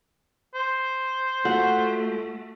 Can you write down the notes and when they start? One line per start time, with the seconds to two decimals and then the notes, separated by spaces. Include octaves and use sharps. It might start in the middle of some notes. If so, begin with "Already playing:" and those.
0.55 C5
1.45 A3 F4 F#4 A4 F#5